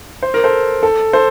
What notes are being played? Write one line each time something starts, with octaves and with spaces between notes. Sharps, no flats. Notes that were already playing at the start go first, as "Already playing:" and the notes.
C5
A#4
A4 C5
A4
A4 C5